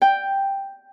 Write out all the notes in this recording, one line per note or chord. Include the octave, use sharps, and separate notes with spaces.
G5